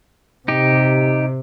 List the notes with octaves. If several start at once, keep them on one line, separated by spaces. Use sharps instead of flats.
C3 D#4 G4